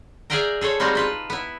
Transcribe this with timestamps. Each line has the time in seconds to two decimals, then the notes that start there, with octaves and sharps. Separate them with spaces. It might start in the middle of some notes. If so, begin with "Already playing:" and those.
0.30 G#4 D5 E5 F5 G5 A#5
0.61 G#4 A4 C5 C#5
0.80 G3 G#3 C4 D#4 F4 F#4
0.95 F4 B4 A5
1.30 B3 E4